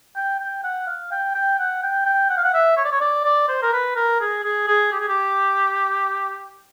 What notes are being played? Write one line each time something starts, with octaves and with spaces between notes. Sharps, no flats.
G5
G5
F#5
F5
G5
G5
F#5
G5
G5
F#5
F5
F#5
E5
C#5
D5
C#5
D5
D5
C5
A#4
B4
A#4
G#4
G#4
G#4
G4
G#4
G4